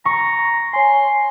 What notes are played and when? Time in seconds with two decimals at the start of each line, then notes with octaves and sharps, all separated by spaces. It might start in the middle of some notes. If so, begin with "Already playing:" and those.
0.05 A#5 C#6
0.73 C#5 G#5 C6